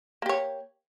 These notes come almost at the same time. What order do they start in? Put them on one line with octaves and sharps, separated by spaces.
A#3 G4 C#5